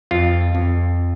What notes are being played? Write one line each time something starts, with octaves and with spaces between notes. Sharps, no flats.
F2 F4
F2